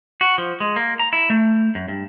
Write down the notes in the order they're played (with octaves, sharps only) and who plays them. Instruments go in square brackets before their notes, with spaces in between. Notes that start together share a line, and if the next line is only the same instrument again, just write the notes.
[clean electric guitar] F#4
F3
G#3
A#3
A#5
E4
A3
F#2
G2